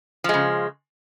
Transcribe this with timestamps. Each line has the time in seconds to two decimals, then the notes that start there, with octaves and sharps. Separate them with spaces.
0.24 F3
0.29 G#3
0.34 C#3